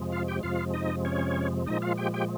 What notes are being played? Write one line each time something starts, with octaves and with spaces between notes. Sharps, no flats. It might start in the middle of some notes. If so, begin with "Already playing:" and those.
Already playing: F2 C3 F3 G#3
F4 F5
G4 G5
F2 C3 F3 G#3 F4 F5
D#4 D#5
C#4 C#5
A#2 F3 G#3 D#4 D#5
F4 F5
G4 G5
G4 G5